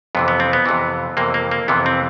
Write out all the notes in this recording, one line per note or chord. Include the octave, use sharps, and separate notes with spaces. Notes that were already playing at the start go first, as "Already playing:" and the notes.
F2 C3 E3 B3
B3
C4
B3
F2 C3 E3
F2 C3 E3 A#3
A#3
A#3
F2 C3 E3 B3
C4